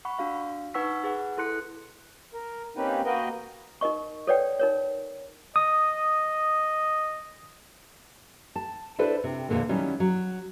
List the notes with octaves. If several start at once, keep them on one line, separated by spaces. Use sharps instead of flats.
F#5 B5 C#6
D4 F#4 F5
D#4 B4 F#5 C#6 E6 B6
G#4 B4 F#5
E4 A4 C6 F#6 C#7
A#4
A#3 C4 C#4 D#4 G4 B4
A#3 F#4 A#4 B4 D#5 G5
D#4 A#4 D#5 C#6
A4 B4 C#5 D5 F#5 G5
D#4 A#4 C#5
D#5 D#6
A5
D4 E4 A4 B4 C5 D5
C3
E2 G2 A#2 D3 G#3 A#3
D#3 F#3 G3 C#4 E4
F#3